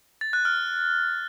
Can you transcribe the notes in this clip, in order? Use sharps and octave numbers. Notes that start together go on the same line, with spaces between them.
A6
F#6
F6